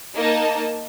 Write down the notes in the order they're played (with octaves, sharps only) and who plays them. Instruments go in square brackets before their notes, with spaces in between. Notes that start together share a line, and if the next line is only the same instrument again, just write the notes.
[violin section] A#3 D#4 D#5 A5